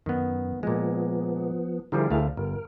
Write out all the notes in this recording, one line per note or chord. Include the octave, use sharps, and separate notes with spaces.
F#2 D#3 B3
A#2 F3 G#3 B3
D3 F3 G3 E4 G#4 A#4
D2 A3 F5
G1 A#4